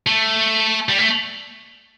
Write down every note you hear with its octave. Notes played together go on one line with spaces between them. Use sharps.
A3
G3
A3